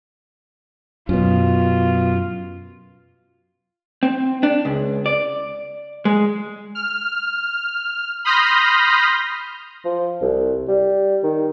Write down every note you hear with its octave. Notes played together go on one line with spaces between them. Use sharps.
F#2 B2 F4
C4
D4
C#2
D5
G#3
F6
B5 C6 D#6 F6 G6 A#6
F3
C2
G3
D#3